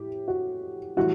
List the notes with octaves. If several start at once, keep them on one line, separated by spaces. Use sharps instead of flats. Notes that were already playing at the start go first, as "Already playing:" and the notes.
Already playing: A2 G4
F#4
A2 E3 G3 F#4